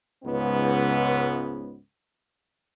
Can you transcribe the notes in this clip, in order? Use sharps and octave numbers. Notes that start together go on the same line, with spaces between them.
C#2 G#2 B3